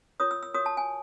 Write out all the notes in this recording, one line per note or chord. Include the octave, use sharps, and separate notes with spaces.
F4 A#4 C#5 D#6
E6
E6
F#4 A#4 C#5 D#6
A5
G#5